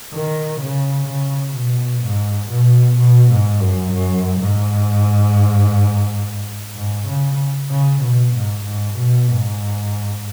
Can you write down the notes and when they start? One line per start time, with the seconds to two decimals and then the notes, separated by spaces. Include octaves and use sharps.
0.13 D#3
0.61 C#3
1.08 C#3
1.55 B2
2.03 G#2
2.51 B2
2.98 B2
3.30 G#2
3.61 F#2
3.92 F#2
4.40 G#2
6.76 G#2
7.08 C#3
7.70 C#3
8.03 B2
8.34 G#2
8.65 G#2
8.97 B2
9.28 G#2